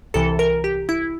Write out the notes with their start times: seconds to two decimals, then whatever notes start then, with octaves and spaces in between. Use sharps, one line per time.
0.14 C2 C3 E3 A4
0.39 A#4
0.64 G4
0.89 E4